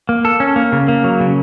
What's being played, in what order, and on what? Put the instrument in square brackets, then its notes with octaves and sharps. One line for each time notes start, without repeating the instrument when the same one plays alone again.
[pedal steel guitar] A#3
A4
C#4
A#3
C#3
A#3
F#3
C#3